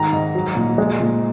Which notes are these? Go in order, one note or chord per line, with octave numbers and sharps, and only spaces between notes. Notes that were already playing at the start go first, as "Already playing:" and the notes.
Already playing: G#2 D#3 A#5
G#2
F#3
A#2
G#3
A#2